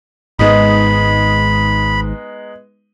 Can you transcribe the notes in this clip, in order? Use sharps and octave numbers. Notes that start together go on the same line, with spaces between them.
G#1 G#2 G#3 B3 D#4 B5